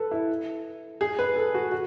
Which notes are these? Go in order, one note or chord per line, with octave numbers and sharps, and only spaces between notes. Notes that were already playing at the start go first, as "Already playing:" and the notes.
Already playing: A4 B4
E4
G#4
B4
A4
F#4
F#4